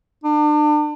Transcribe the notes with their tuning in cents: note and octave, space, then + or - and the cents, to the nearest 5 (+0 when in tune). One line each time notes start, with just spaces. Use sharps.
D4 +35